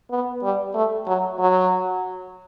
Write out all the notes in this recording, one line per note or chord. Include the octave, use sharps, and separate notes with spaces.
B3
G3
A3
F#3
F#3